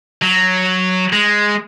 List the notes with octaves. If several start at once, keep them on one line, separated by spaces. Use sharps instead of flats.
F#3
G#3